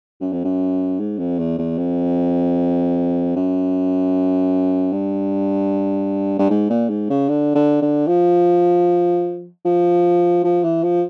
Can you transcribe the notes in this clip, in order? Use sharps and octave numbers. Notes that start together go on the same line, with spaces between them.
F#2
F2
F#2
G#2
F2
E2
E2
F2
F#2
G2
G2
G#2
A#2
G#2
C#3
D3
D3
D3
F3
F3
F3
E3
F3